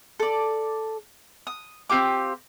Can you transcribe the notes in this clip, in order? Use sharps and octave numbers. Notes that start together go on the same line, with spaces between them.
A4 D5
D#6
C4 F4 G4 D6